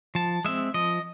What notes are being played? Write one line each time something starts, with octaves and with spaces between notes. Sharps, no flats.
F3 A5
G#3 C4 E5
F3 D#5